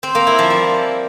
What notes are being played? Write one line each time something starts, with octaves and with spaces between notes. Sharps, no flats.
C4
A#3
E4
F3
G3